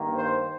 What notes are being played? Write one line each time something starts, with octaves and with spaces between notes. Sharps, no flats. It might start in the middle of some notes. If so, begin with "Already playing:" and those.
Already playing: G2 D#3 A#3
C5